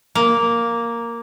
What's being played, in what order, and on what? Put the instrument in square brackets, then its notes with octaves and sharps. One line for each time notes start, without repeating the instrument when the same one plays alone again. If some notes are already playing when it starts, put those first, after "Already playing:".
[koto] A#3